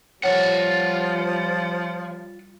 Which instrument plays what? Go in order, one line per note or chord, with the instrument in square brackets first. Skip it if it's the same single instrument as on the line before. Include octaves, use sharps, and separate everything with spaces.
[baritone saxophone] F3 [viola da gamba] G3 [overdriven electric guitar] F4 F#5 [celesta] C#5